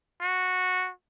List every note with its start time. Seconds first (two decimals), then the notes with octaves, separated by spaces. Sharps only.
0.21 F#4